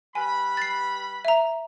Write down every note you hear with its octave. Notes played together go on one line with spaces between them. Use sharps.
G3 B4 G#5 B5
A6 C7
E5 A#5